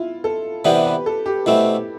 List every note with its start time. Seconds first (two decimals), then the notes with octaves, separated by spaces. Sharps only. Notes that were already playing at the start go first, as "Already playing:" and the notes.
Already playing: E4 F4
0.24 A4
0.65 C3 E3 B3 D4 G4
0.85 B4
1.06 A4
1.26 G4
1.46 B2 A3 C4 E4